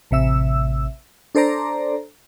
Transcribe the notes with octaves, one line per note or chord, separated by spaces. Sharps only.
A1 C3 E5 E6
D4 A4 C5 D5 A#5